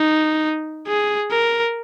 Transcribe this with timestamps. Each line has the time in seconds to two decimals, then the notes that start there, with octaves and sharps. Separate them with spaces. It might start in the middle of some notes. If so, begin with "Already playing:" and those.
Already playing: D#4
0.88 G#4
1.31 A#4